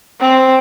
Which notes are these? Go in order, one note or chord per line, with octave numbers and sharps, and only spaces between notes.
C4